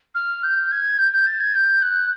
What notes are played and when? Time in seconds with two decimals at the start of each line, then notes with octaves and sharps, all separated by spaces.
0.15 F6
0.43 G6
0.72 G#6
0.98 G6
1.13 G6
1.26 A6
1.40 G#6
1.55 G6
1.82 F#6